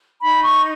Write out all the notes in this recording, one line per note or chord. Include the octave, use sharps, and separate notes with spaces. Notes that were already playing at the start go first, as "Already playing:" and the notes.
D#4 B5
C#6